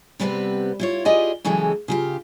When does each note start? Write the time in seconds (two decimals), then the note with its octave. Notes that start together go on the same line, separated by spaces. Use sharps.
0.20 C3 G3 B3 C4 A4 B4
0.80 E4 F4 C#5
1.05 E4 F4 G4 G#4 D5 D#5
1.45 C#3 E3 F#3 G#3 G4 A4
1.88 C#3 F4 G4